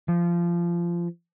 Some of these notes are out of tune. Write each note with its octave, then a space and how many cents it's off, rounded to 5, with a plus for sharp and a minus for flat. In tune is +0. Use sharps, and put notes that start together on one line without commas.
F3 -20